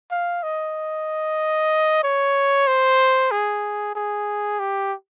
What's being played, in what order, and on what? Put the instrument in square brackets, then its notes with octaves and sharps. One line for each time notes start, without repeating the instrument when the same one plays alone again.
[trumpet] F5
D#5
C#5
C5
G#4
G#4
G4